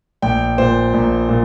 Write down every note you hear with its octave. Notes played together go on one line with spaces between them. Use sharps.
A#1 G5
A#2 C5
A#1
A#2